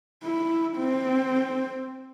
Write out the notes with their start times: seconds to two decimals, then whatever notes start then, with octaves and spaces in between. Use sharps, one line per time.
0.24 E4
0.77 C4